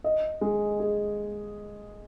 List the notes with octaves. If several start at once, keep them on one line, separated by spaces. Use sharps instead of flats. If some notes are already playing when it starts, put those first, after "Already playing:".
D#5
G#3
G#4